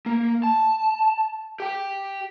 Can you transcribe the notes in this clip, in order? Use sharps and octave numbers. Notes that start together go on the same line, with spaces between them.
A#3
A5
G4 G5